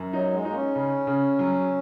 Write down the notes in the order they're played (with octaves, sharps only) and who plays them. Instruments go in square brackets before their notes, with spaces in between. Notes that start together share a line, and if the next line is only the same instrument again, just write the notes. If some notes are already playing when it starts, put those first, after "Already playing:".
Already playing: [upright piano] F#2
[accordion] F#3 [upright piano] D#4
[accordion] G#3
[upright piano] D#4
[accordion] A#3
C#4
[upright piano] C#3
C#3
F#3